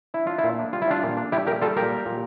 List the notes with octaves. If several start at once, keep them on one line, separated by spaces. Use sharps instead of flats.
D4 E4
D4 F4
E4
A#2
D4
G3 F4
E4
G3 D4 F4
A#2
D4
G3 E4 G4
A#2 G4 A#4
G3 F4 A4
A#2 G4 A#4
G3
A#2